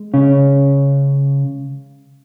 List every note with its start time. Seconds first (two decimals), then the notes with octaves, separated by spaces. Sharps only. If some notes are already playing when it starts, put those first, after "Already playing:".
Already playing: G#3
0.14 C#3 C#4